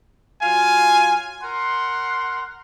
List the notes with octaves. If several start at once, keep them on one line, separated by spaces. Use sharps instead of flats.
F#3 F4 F5 G#5
A#4 F#5 C6